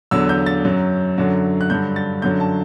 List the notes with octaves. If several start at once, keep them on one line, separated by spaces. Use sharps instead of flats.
E2 D3 F#3 E6
G6
A6
F#2 F#3
F#2 D3 F#3
F#6
G2 D3 F#3 G6
A6
F#2 D3 F#3 G6
A5